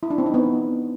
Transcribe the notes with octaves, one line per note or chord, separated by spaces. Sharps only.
E4
D4
C4
D#4
B3